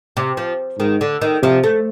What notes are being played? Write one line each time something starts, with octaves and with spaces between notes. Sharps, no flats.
C3
F3
G#2 D#3
D3
D#3
C3 F3
A3